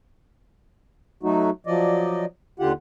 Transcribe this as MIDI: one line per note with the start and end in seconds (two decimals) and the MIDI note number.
1.23 1.50 54
1.23 1.50 57
1.23 1.50 63
1.23 1.50 66
1.67 2.25 53
1.67 2.25 54
1.67 2.25 74
1.67 2.25 75
2.59 2.72 39
2.59 2.72 50
2.59 2.72 65
2.59 2.72 67
2.59 2.72 78